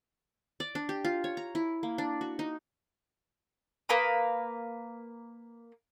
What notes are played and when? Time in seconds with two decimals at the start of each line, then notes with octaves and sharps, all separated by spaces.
0.60 D5
0.75 D4
0.89 G4
1.05 F4
1.24 C#5
1.37 A#5
1.55 E4
1.83 A#3
1.98 D4
2.21 F#4
2.39 D#4
3.89 A#3 B4 A#5 D#6